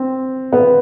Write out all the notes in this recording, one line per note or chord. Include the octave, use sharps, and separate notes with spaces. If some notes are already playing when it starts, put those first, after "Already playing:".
Already playing: C4
B3